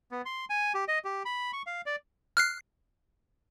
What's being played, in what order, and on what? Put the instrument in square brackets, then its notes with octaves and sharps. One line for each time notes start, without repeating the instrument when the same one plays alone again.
[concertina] B3
C6
G#5
G4
D#5
G4
B5
C#6
F5
D5
[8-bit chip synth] F6 F#6 C7